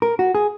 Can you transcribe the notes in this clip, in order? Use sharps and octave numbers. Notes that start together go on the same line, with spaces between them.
A#4
F#4
G#4